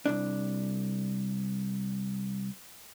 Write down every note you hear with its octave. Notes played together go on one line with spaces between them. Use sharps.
C2 G2 D4